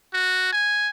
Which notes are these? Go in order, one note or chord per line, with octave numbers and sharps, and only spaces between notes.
F#4
G#5